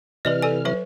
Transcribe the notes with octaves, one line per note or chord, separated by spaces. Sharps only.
C3 E3 B4 D5 D#5 F6
A4 D5 G#5
F#3 B4 E5